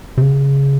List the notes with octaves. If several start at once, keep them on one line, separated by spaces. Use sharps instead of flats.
C3
C#3